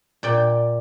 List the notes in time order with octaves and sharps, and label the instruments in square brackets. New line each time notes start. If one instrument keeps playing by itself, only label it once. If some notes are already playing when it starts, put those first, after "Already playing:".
[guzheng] A#2 D5 G5